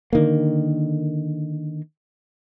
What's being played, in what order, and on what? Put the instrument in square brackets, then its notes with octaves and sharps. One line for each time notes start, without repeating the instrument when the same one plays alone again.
[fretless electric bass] D3 D#3 A#3